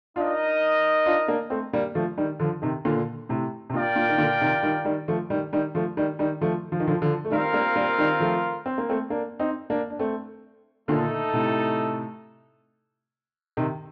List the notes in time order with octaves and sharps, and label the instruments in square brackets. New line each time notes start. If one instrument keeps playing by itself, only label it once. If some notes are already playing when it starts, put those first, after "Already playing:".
[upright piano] D4 F4 [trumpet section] D#4 A#4 D#5
[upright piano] D4 F4
A#3 D4
A3 C4
G3 A#3
F3 A3
D#3 G3
D3 F3
C3 D#3
A#2 D3
A2 C3
C3
[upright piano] A#2 [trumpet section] F4 A#4 D5 G5
[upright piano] A#2
D#3
A#2 D3
C3 D#3
D#3 G3
D#3 G3
F3 A3
D#3 G3
D#3 G3
F3 A3
D#3 G3
D#3 G3
F3 A3
F3
D#3
D3 F3
D3 F3
A3
[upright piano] D#3 G3 [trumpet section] C4 F4 A#4 F5
[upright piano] G3 A#3
G3 A#3
D#3 G3
F3 A3
C4
A#3
A3 C4
A#3 D4
C4 D#4
A#3 D4
D4
A3 C4
[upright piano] A#2 D3 [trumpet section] A3 D#4 A4
[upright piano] A2 C3
C3 D#3